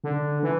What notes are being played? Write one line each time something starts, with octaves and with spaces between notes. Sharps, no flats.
D3
E3